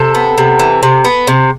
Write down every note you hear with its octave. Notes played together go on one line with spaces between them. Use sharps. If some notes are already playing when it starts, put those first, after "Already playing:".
Already playing: C3 A4
B3
C3
E3
C3
B3
C3